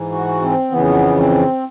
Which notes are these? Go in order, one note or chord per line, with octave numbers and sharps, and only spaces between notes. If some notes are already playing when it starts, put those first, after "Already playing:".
Already playing: G#2 E3
F#4
C4
F2 C#3 E3 B3
C4